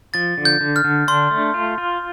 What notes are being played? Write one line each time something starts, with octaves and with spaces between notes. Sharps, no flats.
F3 A6
D3
G6
D3
F6
D3
D4 C6
A3
F4
F4